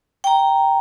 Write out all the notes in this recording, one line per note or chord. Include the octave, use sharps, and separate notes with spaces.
G5 A#5